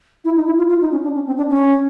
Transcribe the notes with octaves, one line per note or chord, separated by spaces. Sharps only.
E4
D#4
E4
F4
F4
D#4
C#4
D4
C#4
C4
D4
C#4